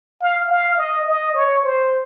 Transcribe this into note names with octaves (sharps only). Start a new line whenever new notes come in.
F5
F5
D#5
D#5
C#5
C5